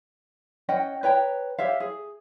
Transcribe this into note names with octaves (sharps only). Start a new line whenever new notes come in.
C#4 D#5 F#5 G5
B4 C#5 G5 A#5
G4 C#5 E5 F5
G#4